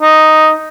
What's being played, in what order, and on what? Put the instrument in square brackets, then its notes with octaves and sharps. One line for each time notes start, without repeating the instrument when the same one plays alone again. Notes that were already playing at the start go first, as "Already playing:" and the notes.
[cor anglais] D#4